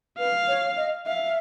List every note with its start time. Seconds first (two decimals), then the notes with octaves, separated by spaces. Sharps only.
0.18 B4 F5
0.48 C#5
0.77 D#5
1.06 E5 F5